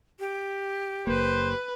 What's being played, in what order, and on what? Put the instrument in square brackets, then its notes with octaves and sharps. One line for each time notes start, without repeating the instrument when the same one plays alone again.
[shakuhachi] G4
[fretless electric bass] F#1 A#3 [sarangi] B4 [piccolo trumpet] C5